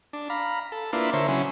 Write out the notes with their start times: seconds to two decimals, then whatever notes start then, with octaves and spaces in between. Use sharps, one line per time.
0.13 D4
0.30 F5 A#5 B5
0.72 A4
0.93 A#3 D4 E4 F4 B4
1.13 D3 A#4 C5 C#5 E5
1.28 C#3 F#3 C#4 E4